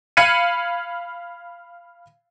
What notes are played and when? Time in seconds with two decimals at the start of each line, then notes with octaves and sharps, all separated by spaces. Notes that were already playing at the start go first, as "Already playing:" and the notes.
0.17 F5 B5 G#6 C#7 D#7